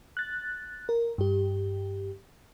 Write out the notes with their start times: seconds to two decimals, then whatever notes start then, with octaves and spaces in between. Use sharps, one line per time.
0.17 F#6 A6
0.89 A#4
1.18 G2 G4